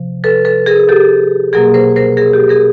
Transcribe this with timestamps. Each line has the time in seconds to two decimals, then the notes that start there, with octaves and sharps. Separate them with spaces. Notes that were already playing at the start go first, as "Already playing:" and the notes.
Already playing: C3 F3
0.24 A4 B4
0.45 A4 B4
0.66 G#4 A#4
0.89 G4 A4
1.53 B2 F#3 A#3 G#4 A#4
1.74 A#4 C5
1.96 A#4 C5
2.17 G#4 A#4
2.33 G4 A4
2.49 G#4 A#4